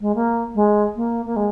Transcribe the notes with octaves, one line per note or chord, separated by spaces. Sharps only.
G#3
A#3
G#3
A#3
A#3
G#3